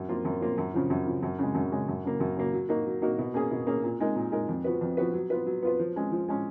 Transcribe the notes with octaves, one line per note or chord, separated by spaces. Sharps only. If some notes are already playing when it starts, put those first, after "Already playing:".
Already playing: F#2
F3 A#3 F4
F#2
F3 A#3 F4
F#2
C#3 F3
F#2
C#3 F3
F#2
C#3 G#3
F#2
C#3 G#3
F#2
C#3 F#3 A#3
F#2
C#3 F#3 A#3
F#3
A#3 D#4 F#4 A#4
F#3
A#3 D#4 F#4 A#4
B2
A#3 C#4 G#4
B2
A#3 C#4 G#4
A#2
G#3 D#4 A#4
A#2
G#3 D#4 A#4
F2
F3 B3 F#4 B4
F2
F3 B3 F#4 B4
F#3
B3 F4 B4
F#3
B3 F4 B4
F3
G#3 C#4
F3
G#3 C#4